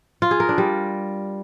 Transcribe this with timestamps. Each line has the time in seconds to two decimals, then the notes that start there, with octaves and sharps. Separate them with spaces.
0.22 F4
0.31 G#4
0.40 A#4
0.49 D4
0.58 G3